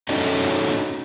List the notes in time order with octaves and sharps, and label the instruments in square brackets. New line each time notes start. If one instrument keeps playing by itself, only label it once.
[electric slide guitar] C#4 D#4 F#4 A4 C#5 D#5